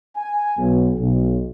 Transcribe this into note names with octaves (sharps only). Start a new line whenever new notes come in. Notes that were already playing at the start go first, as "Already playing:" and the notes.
G#5
B1
B1